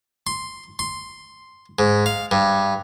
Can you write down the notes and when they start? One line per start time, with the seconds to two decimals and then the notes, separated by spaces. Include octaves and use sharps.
0.27 C6
0.79 C6
1.79 G#2
2.06 F5
2.31 G2